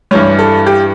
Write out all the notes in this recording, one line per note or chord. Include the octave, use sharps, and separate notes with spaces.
G2 E3 G3 C#5
A4
G4